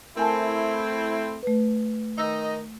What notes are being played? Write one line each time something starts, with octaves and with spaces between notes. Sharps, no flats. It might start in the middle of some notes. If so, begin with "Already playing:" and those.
A3 C4 E4 A#4 G#5 A5
A3 B4
D#3 D#4 D#5 E6